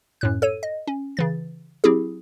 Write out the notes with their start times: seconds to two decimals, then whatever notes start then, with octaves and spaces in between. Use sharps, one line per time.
0.21 F#2 A2 F#6
0.42 A4 C#5 D#7
0.63 D#5
0.87 C#4
1.17 C#3 E3 A6
1.84 F#3 C4 E4 G4 G#4